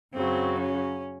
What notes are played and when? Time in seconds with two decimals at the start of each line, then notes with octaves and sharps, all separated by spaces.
0.13 F#2 C#3 F#3 C4
0.60 C#4